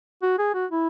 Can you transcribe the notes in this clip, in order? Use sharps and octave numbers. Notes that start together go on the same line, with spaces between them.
F#4
G#4
F#4
E4